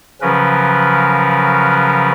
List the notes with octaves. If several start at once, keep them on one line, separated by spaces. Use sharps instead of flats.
C#3 F3 F#3 C#4 A#4 B4